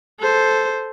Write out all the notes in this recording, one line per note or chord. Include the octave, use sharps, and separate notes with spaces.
A4 C5